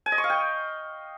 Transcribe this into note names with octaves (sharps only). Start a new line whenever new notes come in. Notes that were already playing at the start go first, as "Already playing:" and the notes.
G#5
D#5
C#6
F5
G5